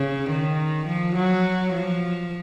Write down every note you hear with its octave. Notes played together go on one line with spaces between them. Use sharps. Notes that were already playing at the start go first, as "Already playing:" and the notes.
Already playing: C#3
D#3
F3
F#3
F3